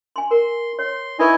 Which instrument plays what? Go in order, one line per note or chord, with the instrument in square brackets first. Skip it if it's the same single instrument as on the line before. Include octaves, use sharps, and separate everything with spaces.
[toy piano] G#5 C6
[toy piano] A#4 [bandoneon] C6
[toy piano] C#5 [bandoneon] C6
[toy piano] D#4 B4 C#6 [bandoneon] E4 D#5 G#5